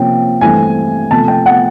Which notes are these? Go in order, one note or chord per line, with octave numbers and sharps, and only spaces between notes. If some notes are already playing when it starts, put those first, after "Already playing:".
Already playing: C3 F3 A#3 C#4 G5
G2 E3 A3 C4 G#5
C3 F3 A3 A5
G5
F#5